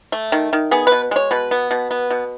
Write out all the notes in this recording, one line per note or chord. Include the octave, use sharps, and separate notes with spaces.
A3
D#3
D#3
B3 G#4
B2 B4
G#3 C#5
B2 B4
B3
B2
B3
B2